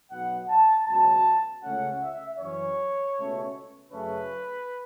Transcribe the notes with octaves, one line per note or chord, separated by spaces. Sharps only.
B1 B2 B3 F#5
A5
C#2 B2 F#3 A5
C#2 C#3 A3 C#4 F#5
E5
F#2 E3 C#4 C#5
C#2 B2 A3 C#4
F#2 C#3 A3 C#4 B4